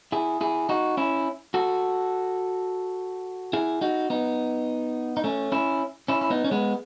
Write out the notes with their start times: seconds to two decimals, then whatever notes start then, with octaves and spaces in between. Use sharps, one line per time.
0.12 E4 G#4
0.41 E4 G#4
0.69 D#4 F#4
0.97 C#4 E4
1.54 F#4 A4
3.53 E4 G#4
3.81 D#4 F#4
4.10 B3 D#4
5.17 D#4
5.24 A3 C#4
5.52 C#4 E4
6.08 C#4 E4
6.21 E4
6.30 B3 D#4
6.44 C#4
6.51 G#3 B3